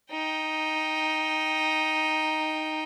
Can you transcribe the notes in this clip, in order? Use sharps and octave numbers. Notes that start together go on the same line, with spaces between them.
D#4 G5